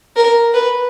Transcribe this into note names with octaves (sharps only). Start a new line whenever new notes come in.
A#4
B4